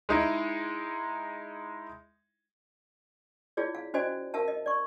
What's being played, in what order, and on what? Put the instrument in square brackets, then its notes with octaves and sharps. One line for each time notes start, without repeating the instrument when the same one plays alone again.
[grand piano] G#3 D#4 E4
[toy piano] E4 F4 G#4 C#5 D5
F5
C#4 F#4 C5 D5 D#5 G#5
A#4 E5 F5 A5
D#5
D5 C#6